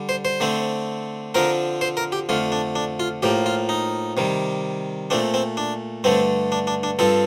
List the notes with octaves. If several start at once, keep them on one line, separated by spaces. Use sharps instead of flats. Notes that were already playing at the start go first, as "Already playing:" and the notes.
Already playing: D3 G3
C5
C5
D3 A3 C4
D3 F3 C4 A#4
C5
A#4
G4
F2 D3 A3 F4
D4
D4
F4
A2 F3 A#3 G4
F4
D#4
C3 D#3 G3
A#2 A3 C4 D4
C4
D4
G2 D3 A3 C4
D4
D4
D4
G2 F3 C4 A4